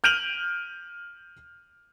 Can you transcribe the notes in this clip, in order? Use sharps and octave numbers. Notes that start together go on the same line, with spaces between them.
F6 G6 D7 D#7 F7 F#7